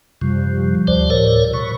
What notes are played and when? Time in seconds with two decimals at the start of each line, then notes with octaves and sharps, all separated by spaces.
0.21 F#2 C3 F3 G3
0.88 D2 C5 D5
1.10 A2 A#4 C#5
1.54 B2 B5 C#6